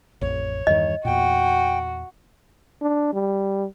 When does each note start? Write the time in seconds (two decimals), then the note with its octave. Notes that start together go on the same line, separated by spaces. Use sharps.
0.21 A1 F2 C#5
0.67 E2 G2 D#3 D#5
1.05 E2 A#2 F#4 G5
2.82 D4
3.13 G3